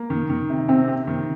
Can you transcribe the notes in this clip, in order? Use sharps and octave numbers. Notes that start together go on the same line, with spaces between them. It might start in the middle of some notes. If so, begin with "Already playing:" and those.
Already playing: A#3
D#3
D#3
C3
C3 C4
C3
D#3